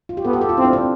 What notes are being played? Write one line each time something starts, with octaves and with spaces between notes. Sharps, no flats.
F4
G4
B3 A4
G4
A4
F4
C4 E4
D4
C4